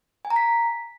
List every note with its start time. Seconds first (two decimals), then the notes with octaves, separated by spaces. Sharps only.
0.25 G#5
0.30 A#5
0.36 B6